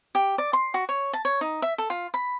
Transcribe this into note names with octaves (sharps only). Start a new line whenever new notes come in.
G4
D5
C6
F#4
C#5
A5
C#5
D#4
E5
A4
F4
B5